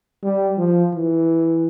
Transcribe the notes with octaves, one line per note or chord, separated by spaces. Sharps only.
G3
F3
E3